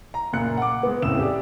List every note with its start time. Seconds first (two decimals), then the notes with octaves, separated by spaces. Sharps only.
0.14 A#5
0.33 F#1 A#2 F#6 C#7
0.58 F#5 D6
0.83 G#3 B3
1.02 F#1 F2 A2 C#3 E6 E7
1.18 G4 G#4 D5